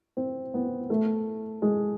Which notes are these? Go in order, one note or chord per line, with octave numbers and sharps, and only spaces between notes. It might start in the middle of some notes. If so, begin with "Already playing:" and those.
C4
B3
A3
G#3